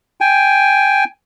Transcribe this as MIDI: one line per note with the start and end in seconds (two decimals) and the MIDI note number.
0.21 1.04 79
0.21 1.04 80